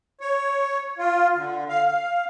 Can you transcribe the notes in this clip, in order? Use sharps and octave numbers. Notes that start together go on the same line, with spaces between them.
C#5
F4
D3
F5
F5